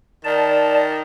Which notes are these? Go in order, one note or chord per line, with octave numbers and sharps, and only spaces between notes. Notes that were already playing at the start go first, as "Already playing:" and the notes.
D#3 D5 A5